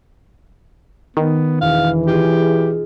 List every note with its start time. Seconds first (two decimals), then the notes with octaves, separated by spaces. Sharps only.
1.17 D#3 B3
1.61 E1 E3 F5
2.07 D#4 F4 G4 G#4